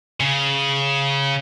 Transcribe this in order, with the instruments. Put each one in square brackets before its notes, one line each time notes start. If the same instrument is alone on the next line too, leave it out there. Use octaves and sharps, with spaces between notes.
[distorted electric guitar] C#3